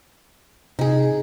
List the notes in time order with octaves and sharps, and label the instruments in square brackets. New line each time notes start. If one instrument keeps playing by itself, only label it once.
[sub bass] C3 [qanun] D#4 G#4